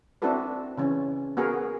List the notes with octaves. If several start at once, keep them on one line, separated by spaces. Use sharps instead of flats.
C4 D4 E4 F#4 A4 B4
C#3 E3 C#4
B3 F#4 G#4 A#4